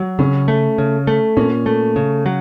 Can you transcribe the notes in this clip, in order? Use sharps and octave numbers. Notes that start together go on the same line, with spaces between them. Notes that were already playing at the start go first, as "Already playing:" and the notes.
Already playing: F#3
C#3 C#4
A3
C#3
A3
A#2 C#4
A3
C#3
F#3